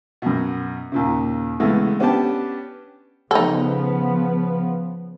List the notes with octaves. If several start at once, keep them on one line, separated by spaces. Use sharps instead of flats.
F#2 B2
D#2 A#2 C#3
C#2 E3 G#3 A3 B3
B3 C#4 D4 G4 G5 A5
C#3 F3 B3 D#4 A4